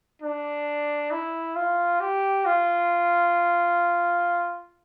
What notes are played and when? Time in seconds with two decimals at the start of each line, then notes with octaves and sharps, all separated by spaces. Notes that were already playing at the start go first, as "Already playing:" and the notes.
0.22 D4
1.11 E4
1.56 F4
2.00 G4
2.45 F4